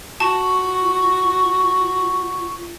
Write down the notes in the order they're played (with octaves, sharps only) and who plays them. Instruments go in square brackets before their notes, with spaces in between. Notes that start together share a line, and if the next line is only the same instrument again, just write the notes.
[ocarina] F4 [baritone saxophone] F#4 [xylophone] A5 [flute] C#6